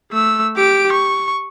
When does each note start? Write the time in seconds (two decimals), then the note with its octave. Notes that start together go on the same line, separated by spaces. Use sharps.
0.11 A3 E6
0.57 G4 D7
0.92 C#6